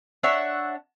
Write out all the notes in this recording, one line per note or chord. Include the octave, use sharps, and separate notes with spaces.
D4 C#5 E5 F#5